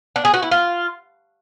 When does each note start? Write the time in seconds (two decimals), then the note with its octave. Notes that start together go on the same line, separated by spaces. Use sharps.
0.16 D4
0.25 G#4
0.34 F#4
0.43 E4
0.51 F4